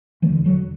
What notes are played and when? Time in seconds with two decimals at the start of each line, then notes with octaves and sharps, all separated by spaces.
0.22 E1 D2 D3 E3 A3
0.45 D3 F#3